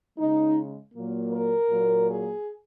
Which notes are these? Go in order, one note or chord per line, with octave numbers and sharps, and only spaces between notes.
C#3 G#3 D#4
A#2 F#3 A#3
A#4
A#2 F#3 A#3
G#4